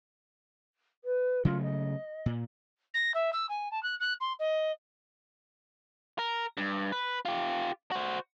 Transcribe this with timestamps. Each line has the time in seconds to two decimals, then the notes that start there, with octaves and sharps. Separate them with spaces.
1.04 B4
1.45 C#3 F#3 A3 F4
1.62 D#5
2.26 A#2
2.94 A#6
3.14 E5
3.33 E6
3.49 G#5
3.71 A5
3.83 F#6
4.00 F#6
4.21 C6
4.39 D#5
6.19 A#4
6.57 G2
6.92 B4
7.25 F4 G4
7.91 F#4 C5